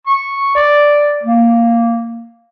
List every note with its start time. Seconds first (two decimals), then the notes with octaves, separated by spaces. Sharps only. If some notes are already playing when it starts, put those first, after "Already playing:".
0.07 C#6
0.55 D5
1.23 A#3